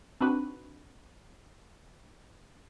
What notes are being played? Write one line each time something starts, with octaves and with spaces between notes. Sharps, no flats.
C4 D4 D#4 F#4 B4